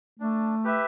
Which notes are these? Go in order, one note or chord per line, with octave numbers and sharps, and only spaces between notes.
A3 D4
G4 B4 E5